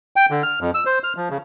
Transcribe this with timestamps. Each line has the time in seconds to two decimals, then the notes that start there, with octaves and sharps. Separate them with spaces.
0.16 G5
0.30 D3
0.43 F6
0.61 F2
0.74 E6
0.86 C5
1.04 F6
1.16 F3
1.30 C#3